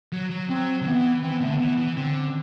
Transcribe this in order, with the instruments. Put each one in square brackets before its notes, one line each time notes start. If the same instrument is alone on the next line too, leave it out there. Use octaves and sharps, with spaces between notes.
[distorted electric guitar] F#3
F#3
[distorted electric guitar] F#3 [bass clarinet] C4
[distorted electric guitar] D3
[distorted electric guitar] E3 [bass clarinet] B3
[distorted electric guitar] E3 [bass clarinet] C4
[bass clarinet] B3
[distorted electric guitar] D3 [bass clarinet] A3
[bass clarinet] B3
[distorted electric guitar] E3
E3
[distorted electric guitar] D3 [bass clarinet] C4
[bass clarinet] C4